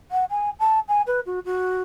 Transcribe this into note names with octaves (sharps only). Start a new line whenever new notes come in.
F#5
G#5
A5
G#5
B4
F#4
F#4